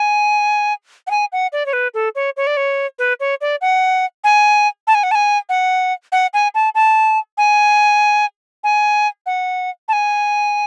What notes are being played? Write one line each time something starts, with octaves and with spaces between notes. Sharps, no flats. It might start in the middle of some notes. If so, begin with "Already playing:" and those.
Already playing: G#5
F#5
G#5
F#5
D5
C#5
B4
A4
C#5
C#5
D5
C#5
B4
C#5
D5
F#5
G#5
A5
G#5
F#5
A5
G#5
F#5
F#5
G#5
A5
A5
G#5
G#5
F#5
A5
G#5